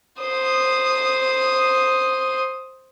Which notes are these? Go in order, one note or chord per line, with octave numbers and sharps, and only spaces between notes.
C5 D#6